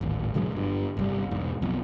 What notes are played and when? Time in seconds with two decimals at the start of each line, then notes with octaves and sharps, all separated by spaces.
0.01 D1 G#1
0.34 E1 D3 F#3 G#3
0.52 G1 G2
0.97 G1 C2 G3
1.31 E1 G#2
1.62 B1 F2